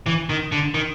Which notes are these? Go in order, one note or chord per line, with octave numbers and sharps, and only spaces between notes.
E3
D#3
D3
D#3